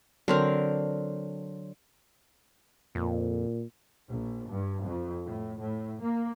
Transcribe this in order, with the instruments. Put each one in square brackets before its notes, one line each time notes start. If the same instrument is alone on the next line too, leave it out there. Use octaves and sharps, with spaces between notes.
[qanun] D3 C4 A#4 [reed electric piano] F#3 C#5
[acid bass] F2 [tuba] A#2
[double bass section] A#1
G2
F2
A2
A2
A#3